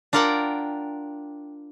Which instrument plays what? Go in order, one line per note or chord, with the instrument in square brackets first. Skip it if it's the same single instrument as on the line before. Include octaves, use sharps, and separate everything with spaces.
[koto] D4 F4 A#4 D5 F#5 G5